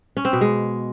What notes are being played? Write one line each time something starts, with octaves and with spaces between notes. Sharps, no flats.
C#4
C4
B2
G#3